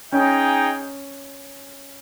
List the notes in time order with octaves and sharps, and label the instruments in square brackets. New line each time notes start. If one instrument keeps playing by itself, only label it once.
[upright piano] C#4 [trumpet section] D#4 G#4 D#5 G5